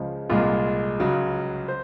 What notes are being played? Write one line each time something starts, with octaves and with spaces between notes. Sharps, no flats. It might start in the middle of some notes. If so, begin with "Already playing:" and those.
Already playing: C#2 C#3 F3 G#3
C2 A#2 G#3 F4
C#2 C#3 F#3
C5